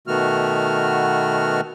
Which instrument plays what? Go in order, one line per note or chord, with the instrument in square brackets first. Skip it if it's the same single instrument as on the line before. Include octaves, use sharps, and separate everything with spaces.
[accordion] B2 D#3 A3 B3 F#4 F6